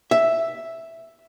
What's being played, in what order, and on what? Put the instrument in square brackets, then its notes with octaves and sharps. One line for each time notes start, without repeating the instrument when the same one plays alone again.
[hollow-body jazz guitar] E5